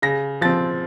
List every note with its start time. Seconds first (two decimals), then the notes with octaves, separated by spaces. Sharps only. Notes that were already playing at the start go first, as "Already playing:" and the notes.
0.02 C#3 A#6
0.41 F3 C4 A6